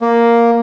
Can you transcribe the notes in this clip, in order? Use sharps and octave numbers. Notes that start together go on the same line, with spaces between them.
A#3